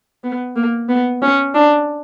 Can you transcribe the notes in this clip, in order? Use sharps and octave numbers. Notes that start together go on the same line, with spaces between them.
B3
A#3
B3
C#4
D4